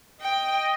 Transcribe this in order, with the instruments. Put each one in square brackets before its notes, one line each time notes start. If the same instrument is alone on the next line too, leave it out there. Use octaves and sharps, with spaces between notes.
[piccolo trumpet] D#5 [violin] G5